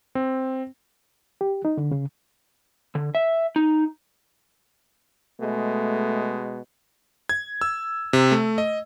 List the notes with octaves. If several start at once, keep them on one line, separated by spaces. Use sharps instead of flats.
C4
G4
D#4
D3
C#3
D3
E5
D#4
B2 G#3 A3
G#6
E6
C3
A3
D#5